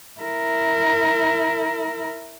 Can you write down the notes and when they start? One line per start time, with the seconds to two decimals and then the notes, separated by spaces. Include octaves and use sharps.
0.21 E4 A#4